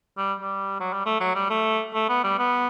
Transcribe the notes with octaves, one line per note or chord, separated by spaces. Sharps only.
G3
G3
F#3
G3
A3
F#3
G3
A3
A3
B3
G3
B3